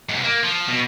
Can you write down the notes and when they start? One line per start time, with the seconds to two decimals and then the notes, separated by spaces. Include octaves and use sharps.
0.09 G#2 C3
0.24 A#3
0.43 F3
0.68 B2